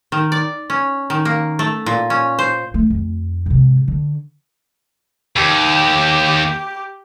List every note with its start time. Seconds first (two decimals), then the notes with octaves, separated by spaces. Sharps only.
0.12 D#3
0.32 D5
0.70 C#4
1.10 D#3
1.25 A#3
1.59 A3
1.86 A#2
2.10 C#4
2.39 C5
2.74 A3
2.90 F2
3.46 G#2 C3
3.88 D3
5.36 D#2 G4